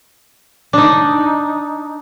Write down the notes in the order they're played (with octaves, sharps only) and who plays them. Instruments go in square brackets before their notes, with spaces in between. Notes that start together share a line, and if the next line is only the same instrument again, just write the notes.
[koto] D4 D#4